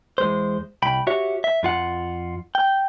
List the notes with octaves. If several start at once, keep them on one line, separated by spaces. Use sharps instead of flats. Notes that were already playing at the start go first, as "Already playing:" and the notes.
E2 G#3 C5
C2 G5 B5
F#4 G4 C#5 E5
E5
F2 F4 F#5
G5